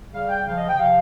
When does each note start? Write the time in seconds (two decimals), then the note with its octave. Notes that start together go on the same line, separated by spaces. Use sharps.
0.12 C#3 G3 F5
0.29 G5
0.46 C#3 F3 F5
0.58 D#5
0.68 G5
0.79 C3 F3 F5